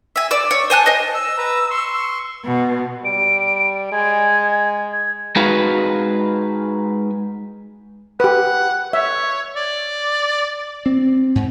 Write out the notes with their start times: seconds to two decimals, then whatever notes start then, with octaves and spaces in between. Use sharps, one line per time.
0.16 E5 G#5
0.31 D5 E6
0.51 C#5
0.70 C5 G#5 A5 F#6
0.86 C5 D#5
1.14 E6
1.37 B4 A#5
1.70 C6 C#6
2.45 B2
3.04 G3 D7
3.92 G#3 G#6
4.91 G#6
5.36 G#3 D#4 F#4 G#4 B4 F5
8.20 G4 B4 F#5
8.93 C#5 E5
9.56 D5
10.86 C4
11.35 G#2